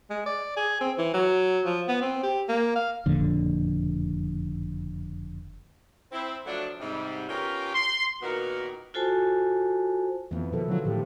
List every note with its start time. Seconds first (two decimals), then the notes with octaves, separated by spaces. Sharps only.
0.10 G#3
0.26 D5
0.57 G#4
0.81 C4
0.98 E3
1.14 F#3
1.65 F3
1.88 B3
2.02 C4
2.23 G4
2.49 A#3
2.76 F5
3.06 F#1 F2 A#2 D3
6.12 C4 E4
6.46 F3 F#3 A3 D4
6.80 G#2 C3 G3
7.29 B3 C#4 F4 G4 A#4
7.74 C6
8.22 A#2 D#3 B3 F#4 A#4
8.94 F4 F#4 A4 C5 G#5 A5
10.31 F2 E3 B3
10.53 B2 D#3 F3 A4
10.68 D3 E3 F#3 F4
10.85 A2 D#3 G4